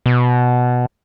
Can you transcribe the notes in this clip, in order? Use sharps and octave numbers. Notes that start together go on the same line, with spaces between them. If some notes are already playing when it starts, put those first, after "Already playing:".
B2